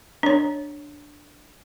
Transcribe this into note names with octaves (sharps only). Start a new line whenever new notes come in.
D4 C#5